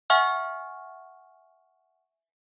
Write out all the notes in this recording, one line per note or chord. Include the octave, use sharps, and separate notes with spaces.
E5 F#5 G#5 C#6 F6